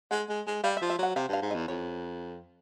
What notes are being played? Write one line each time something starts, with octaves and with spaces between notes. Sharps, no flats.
G#3 F#5
G#3
G#3
G3 F5
E5
F3
E5
F#3 F#5
C3 F5
G2
F5
G#2
D#5
E2
F2 C#5